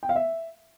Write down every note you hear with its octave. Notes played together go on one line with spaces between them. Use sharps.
G5
F5
E5